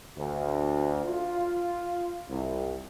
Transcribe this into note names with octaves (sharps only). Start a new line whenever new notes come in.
D2
F4
C2